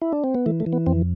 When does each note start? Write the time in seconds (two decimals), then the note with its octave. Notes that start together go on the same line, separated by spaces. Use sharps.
0.02 E4
0.12 D4
0.24 C4
0.35 B3
0.46 E3 A3
0.60 A3
0.66 E3
0.73 B3
0.86 F2 C4